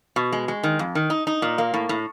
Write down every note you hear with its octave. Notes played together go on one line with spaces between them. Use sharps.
B2
G#3
G#3
D#3
F2
D#3
D#4
D#4
A#2
A#3
A2
A2